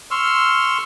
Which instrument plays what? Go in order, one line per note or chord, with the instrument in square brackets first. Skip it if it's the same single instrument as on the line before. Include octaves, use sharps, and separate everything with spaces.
[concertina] C6 C#6 E6 F6